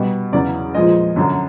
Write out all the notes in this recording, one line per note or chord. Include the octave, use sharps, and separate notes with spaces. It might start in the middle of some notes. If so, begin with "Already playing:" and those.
Already playing: B2 G3
E2 C#3 F#3 D5
A#2 F3 G#3 D#5
F#2 D3 F#3